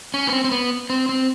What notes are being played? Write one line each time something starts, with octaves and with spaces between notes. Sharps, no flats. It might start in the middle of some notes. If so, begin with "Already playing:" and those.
C#4
B3
C4
C4
B3
C4
C4